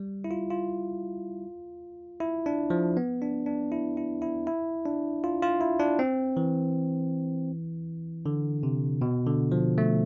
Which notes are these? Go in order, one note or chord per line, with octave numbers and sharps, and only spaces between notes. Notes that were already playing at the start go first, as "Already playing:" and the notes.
Already playing: G3
E4
F4
F4
E4
D4
F3
B3
D4
D4
E4
E4
E4
E4
D4
F4
F4
E4
D4
C4
E3
D3
C3
B2
D3
F3
A3